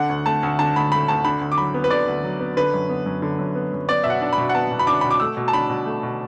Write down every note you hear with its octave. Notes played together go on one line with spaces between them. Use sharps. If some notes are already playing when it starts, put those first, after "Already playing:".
Already playing: D3 F#5
D2
A3 A5
D2
D3 A5
D2 B5
A3 B5
D2 A5
D3 B5
D2
D6
F#3 B5
B3
B4
D3 D5
D2
F#3
B3
D3 B4
F#2
B3
F#2
D3
F#2
B3
F#2
B3 D5
B2 E5
F#5
D4
B5
B2
F#5
B3 A5
B2
B5
D4 D6
B2 B5
D6
A3 E6
B2
A5
D4 B5
B2
A3
B2